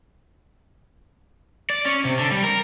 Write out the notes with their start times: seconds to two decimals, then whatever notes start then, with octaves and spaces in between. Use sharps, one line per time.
1.70 D5
1.86 C#4
2.05 C3
2.19 D3
2.32 G3
2.44 A#4